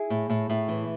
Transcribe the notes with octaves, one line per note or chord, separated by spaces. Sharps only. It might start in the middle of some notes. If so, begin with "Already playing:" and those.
Already playing: E4 G#4
A2
A2
A2
E3